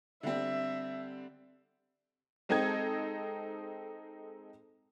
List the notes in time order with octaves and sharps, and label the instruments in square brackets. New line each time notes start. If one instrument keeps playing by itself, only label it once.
[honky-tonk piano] D3 G3 C4 [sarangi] E5
[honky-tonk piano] G#3 C4 D#4 A4 D#5 G#6